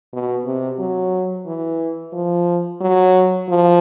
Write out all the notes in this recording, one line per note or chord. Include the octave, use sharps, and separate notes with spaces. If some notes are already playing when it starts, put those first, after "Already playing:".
B2
C3
F#3
E3
F3
F#3
F3